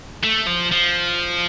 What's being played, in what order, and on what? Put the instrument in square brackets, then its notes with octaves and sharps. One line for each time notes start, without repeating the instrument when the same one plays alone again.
[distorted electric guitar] A3
F3
F3